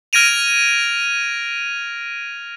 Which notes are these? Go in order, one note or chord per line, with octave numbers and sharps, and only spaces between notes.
F6 G#6 A#6 D7 D#7 F7